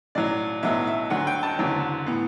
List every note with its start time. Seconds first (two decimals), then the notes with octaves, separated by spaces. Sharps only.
0.15 B1 A2 F#3 C#4 D5
0.63 B1 A2 F#3 B3 E5
0.87 E5
1.10 D2 D3 F#3 F#5
1.27 G5
1.43 A5
1.59 F#1 E2 D3 F#3 C#4
2.07 A2 E3 B3